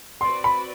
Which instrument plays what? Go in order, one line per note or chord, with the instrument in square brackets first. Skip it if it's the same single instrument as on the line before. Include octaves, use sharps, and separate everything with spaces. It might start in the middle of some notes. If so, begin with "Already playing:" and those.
[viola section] C4 F#4 B4 D5 [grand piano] C6
[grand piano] B5